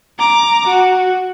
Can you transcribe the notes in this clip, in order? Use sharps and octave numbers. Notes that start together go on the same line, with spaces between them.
A#5 D6
F#4